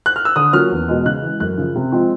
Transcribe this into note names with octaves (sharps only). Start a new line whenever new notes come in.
F#6
F6
E6
D3 D#6
F#3 A#3 C#4 F4 F6
E2
B2 G#3
C#3 F#6
E3 G#3
F#2 F#6
C#3 F3
C3
F3 G#3 C4 F4